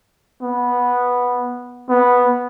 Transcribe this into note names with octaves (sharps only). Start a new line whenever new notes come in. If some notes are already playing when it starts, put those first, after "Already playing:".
B3
B3